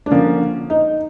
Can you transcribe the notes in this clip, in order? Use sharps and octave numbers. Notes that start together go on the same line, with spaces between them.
D4
D3 F3 A#3 C#4
D#4